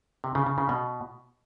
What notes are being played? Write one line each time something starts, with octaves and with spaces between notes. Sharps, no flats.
C3
C#3
C#3
C#3
B2